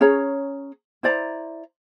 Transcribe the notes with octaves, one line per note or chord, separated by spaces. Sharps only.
C#4 G#4 C#5 A#5
E4 C5 D5 A#5